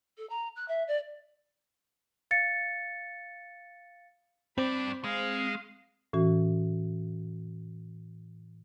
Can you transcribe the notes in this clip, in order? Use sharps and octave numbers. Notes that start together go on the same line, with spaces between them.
A4
A#5
F#6
E5
D5
F5 A6 C#7
G2 C4 D5 B5
G#3 F5
A2 E3 C#4 F#4